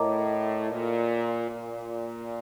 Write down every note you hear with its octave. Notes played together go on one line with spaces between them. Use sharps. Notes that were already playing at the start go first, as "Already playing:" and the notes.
Already playing: A2 A#4 D#5 A#5 D6
A#2
A#2